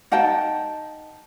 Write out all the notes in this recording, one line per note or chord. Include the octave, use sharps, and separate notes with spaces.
D#4 F#5 G5 A5